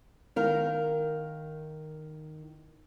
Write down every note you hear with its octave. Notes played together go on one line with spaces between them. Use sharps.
D#3 A#4 F5